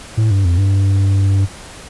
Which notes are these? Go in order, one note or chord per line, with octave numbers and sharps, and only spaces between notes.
A2
G2
F2
G2